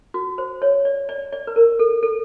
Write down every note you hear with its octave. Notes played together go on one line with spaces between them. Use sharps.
F#4
C5
C#5
D5
D5
D5
B4
A#4
A4
A4